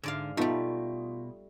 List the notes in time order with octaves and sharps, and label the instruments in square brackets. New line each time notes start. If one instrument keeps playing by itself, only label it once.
[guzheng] G#2 D5 F5 [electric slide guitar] D3
[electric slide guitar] B2 [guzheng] G3 A3 [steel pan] B3 D#4 [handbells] F4